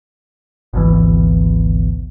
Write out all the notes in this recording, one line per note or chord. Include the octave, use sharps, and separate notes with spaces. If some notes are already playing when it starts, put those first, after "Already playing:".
G#1 D2 B2 E3